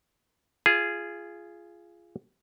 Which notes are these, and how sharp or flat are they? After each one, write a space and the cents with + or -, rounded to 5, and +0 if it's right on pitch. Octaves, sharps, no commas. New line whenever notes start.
F4 -20 G#4 +0